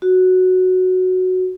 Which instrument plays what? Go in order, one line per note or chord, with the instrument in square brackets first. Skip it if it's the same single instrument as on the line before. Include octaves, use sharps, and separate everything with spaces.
[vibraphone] F#4